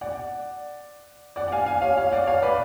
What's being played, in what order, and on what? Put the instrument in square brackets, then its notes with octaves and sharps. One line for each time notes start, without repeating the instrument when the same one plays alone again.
[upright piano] D5 F#5
D5 F#5
F#5
F5 G#5
F5 G#5
C#5 F5
C#5 F5
D5 F#5
C#5 F5
B4 D5